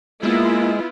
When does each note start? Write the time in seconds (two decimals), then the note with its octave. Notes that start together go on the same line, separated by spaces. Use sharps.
0.23 G#3 A#3 B3 E4 F4